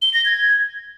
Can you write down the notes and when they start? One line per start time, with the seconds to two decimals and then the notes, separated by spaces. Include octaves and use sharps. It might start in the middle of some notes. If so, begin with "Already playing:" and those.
0.02 G7
0.14 A#6
0.26 G#6